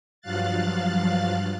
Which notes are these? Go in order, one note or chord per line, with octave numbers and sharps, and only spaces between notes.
G2 F3 F#3 F5 F#6 A6